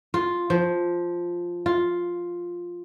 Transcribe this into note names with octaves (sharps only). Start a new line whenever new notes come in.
F4
F3
F4